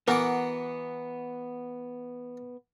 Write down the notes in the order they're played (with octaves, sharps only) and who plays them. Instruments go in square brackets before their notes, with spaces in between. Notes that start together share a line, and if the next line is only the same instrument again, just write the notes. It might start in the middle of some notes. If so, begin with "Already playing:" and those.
[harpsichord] E3 F#4 D6 [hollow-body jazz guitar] B3 A#4